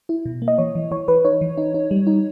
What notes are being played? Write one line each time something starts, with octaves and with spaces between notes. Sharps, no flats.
E4
B2
A#3
D#5
E3 C#5
E3
E3 C#5
E3 B4
D#4 C#5
E3
D#4
D#4
G3
D#4